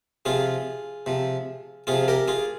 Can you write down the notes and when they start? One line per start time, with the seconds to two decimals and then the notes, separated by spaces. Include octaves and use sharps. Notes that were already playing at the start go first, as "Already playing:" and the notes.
0.25 C3 F3 F4 G#4
1.06 C3 F3
1.87 C3 F3 F4 G#4
2.08 G4 A#4
2.28 F4 G#4